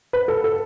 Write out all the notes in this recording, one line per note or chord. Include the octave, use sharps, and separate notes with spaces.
B4
A4
A4